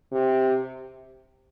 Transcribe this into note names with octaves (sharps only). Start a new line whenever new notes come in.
C3